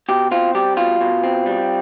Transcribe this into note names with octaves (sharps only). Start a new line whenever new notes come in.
B2 G4
C4 F4
G3 G4
B2 F4
B2
C4
G3